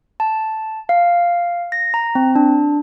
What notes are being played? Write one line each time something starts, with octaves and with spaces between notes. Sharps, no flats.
A5
F5
A#6
A#5
C4
D4